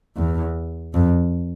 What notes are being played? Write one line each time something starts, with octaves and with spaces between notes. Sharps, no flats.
E2
F2